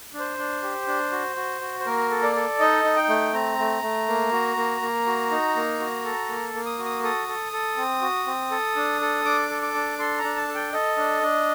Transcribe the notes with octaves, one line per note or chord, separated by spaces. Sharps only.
D4
C5
D4
G4
D4
F#4
F#4
F#4
C5
A#3 A#4
A4
D5
A4
D#4 D#5
D#4
G5
A3
C4 A#5
A3
A3
A#3
F#4
A#3
A#3
F#4
D#4
A#3
F#4
A4
A#3
A#3
D#6
F#4
D#6
A4 D#6
A4
A4
C4
F#4
C4
A4
D4
A4
D4 D6
A4
D6
D4
A4 C6
A#5
D4
A5
A4
G5
A4 D#5
D4
D4